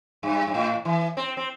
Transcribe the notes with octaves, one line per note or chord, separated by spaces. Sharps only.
G2
G2
A2
E3
C4
C4